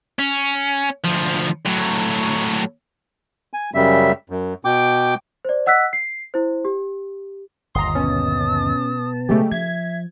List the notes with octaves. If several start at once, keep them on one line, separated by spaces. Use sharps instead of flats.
C#4
D2 F3
A2 F#3
G#5
F#2 C#3 G3 E5
F#2
B2 G5 D6
C5 D5
D#5 F#5 E6 F#6 B6
C7
E4 C5
G4
G1 D#2 A#5 C6 D#6
B2 B3 C#4 A5
C#3 F#3 G#3 A3 C#4 G4
F3 E5 G#6